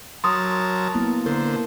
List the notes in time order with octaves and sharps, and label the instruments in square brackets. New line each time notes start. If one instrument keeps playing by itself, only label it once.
[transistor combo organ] F#3 A#4 A5 [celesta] C6 D#6
[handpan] A#3 B3 E4
[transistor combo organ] D3 C5 [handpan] A#4